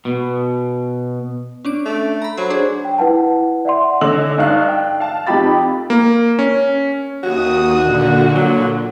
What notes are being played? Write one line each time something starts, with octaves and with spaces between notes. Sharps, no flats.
B2
C#4 D4 D7
A3
A#5 B5
F#3 C5
D4 G#4 C5
G5
E4 B4 F#5 A5
D5 E5 F#5 C6
D3 C#4 D#5 E6 F#7
G2 D#4 F5 F#6
G5
F5 A5
F2 F3 D#4 G4 B5 A6
A#3
C#4
D#2 F#4 D#6
A#2 D3
F#3